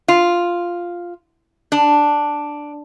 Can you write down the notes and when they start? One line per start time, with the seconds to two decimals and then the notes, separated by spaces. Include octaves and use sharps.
0.08 F4
1.72 D4